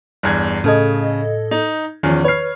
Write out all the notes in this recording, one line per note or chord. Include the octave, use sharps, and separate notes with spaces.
G1 E2 G#6
A2 C#3 A4 D#5 G#6
D#4
E2 D#3 F3 C#4
B4 C#5 F6 C7